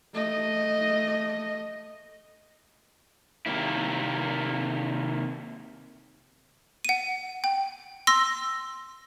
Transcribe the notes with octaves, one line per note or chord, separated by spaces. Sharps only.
A3 D#5
C3 D#3 A#3 E4
F#5 D#7
G5
C6 E6 A#6